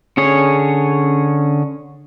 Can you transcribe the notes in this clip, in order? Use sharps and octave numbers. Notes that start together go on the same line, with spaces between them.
D3 C#4 G#4 C#5